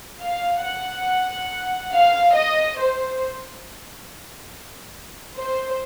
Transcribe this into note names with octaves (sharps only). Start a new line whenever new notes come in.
F5
F#5
F5
D#5
C5
C5